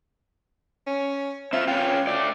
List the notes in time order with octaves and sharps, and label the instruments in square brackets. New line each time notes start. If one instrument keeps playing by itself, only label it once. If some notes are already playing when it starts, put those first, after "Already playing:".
[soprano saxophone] C#4
[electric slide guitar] C4 F4 [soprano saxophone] E5
[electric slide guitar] C#4 F4 [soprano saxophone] G5
[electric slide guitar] A3 D5